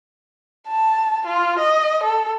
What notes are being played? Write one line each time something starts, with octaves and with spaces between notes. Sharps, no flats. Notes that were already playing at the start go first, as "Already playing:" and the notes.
A5
F4
D#5
A4